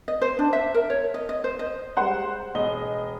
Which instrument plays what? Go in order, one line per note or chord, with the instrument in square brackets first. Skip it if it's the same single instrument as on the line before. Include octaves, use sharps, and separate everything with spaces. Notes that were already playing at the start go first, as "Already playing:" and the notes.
[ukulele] D#5
C5
D4
E5
A#4
C#5
D#5
D#5
C5
D#5
[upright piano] G3 G#3 C5 F#5 F#6
E1 D#5 G7